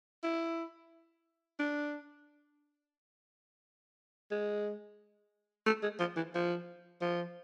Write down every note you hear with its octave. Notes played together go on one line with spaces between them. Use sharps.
E4
D4
G#3
A3
G#3
F3
E3
F3
F3